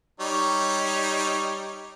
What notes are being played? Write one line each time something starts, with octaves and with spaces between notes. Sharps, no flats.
G3 D#4 C#5